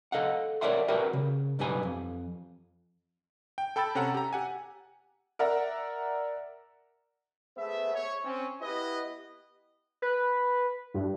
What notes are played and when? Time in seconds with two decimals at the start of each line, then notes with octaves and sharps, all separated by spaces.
0.12 A4 D#5 F5 F#5
0.61 A#4 C#5 D5 E5 F#5 C6
0.88 F#4 G4 A#4 B4 G5
1.13 C#3
1.59 B1 G2 G4 B4 G#5
1.83 F2
3.58 G5
3.76 A4 G5 B5 E6 A6
3.95 C3 C#4 A4 F#5 A#5
4.14 G4 A#5
4.33 G4 F#5 G#5
5.39 A#4 D5 E5 F#5 A#5
7.57 A3 B3 G#4 C5 E5
7.94 C#5
8.24 C4 C#4
8.61 B3 E4 G4 B4 D#5
10.02 B4
10.94 G2